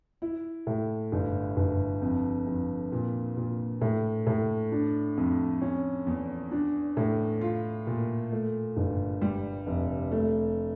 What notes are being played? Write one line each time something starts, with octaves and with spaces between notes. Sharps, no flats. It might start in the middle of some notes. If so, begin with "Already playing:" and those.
E4
A2
G1
G1
F2
F2
A#2
A#2
A2
A2
D4
F2
C#4
E2
D4
A2
F4
A#2
A3
G1
G3
F1
A3